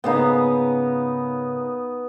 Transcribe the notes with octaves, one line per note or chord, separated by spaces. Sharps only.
G#2 C#3 A#3 B3 D#4